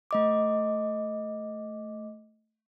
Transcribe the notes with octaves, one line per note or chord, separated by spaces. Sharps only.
A3 D#5 D6